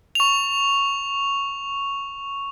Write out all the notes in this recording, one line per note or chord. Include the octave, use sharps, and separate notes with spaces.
C#6 F7